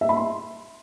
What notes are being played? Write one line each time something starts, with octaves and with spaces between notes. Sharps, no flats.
E5
B5
C6